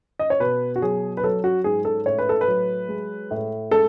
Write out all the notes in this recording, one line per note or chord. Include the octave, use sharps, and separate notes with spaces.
D#5
C#5
B2 B4
F#4
F#3 G#4
B4
F#3 A4
F#4
G#2 G#4
A4
A2 C#5
B4
A4
B4
F#3
G#3
A2
G#3 A4